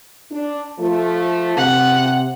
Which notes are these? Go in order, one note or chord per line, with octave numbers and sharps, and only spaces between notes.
D4
F3 A3
C3 F#5